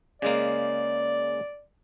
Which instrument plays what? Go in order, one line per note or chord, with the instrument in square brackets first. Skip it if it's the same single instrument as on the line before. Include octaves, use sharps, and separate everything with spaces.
[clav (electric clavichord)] C#3 G#3 A#3 [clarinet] D5